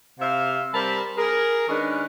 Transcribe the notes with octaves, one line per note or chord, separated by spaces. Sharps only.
C3 C5 E5 F5
G3 C4 A#4 A5 B5
G#4 A#4
D#3 G#3 C#4 D4 G#4 B4